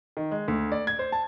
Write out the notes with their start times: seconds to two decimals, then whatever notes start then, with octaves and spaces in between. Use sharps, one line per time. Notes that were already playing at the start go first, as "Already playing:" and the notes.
0.17 D#3
0.31 G#3
0.48 D2
0.72 D5
0.87 G#6
0.99 C5
1.12 A5